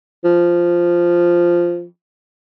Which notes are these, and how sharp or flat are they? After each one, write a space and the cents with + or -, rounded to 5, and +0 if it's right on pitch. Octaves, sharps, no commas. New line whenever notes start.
F3 -5